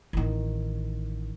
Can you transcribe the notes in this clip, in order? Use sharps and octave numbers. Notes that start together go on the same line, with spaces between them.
A1 D#3